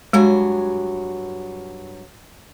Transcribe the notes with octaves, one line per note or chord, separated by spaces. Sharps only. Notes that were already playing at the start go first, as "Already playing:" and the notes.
G2 F#3 G#3 G#5